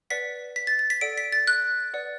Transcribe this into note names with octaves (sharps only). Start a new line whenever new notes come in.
B4 D5 F#5 B6
B6
A6
A6
B6
A4 D5 F#5 D7
B6
A6
F#6
B4 D5 F#5